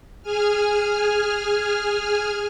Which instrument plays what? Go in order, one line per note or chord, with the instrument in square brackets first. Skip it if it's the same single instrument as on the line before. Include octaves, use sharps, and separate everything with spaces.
[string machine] G#4 G#5 F6